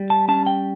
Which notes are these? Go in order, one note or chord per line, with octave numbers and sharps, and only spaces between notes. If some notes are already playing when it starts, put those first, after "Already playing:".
Already playing: G3
A5
C#4 A5
G5